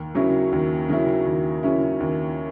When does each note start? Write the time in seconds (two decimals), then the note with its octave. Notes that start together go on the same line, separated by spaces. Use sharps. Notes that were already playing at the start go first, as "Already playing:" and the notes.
Already playing: D#2
0.15 C#3 F#3 C#4 E4
0.52 D#2
0.89 C#3 F#3 C#4 E4
1.26 D#2
1.63 C#3 F#3 C#4 E4
2.00 D#2